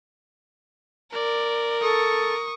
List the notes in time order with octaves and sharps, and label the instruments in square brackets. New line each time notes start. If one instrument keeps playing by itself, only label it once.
[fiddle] A#4 [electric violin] D5
[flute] A4 [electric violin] C#6 D#6